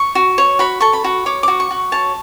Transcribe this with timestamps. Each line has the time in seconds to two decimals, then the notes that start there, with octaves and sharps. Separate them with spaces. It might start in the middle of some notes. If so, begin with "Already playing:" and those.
Already playing: C#6
0.15 F#4
0.38 C#5
0.59 F#4 B5
0.80 A4 C#6
0.93 B5
1.04 F#4
1.26 C#5 D6
1.43 F#4 D6
1.60 C#6
1.71 F#4
1.92 C#5 A5